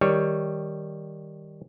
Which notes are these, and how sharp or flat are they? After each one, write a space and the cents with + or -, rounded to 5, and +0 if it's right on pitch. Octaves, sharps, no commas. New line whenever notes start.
D#3 +0 G3 +0 C#5 +0